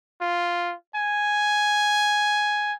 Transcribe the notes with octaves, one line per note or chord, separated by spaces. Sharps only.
F4
G#5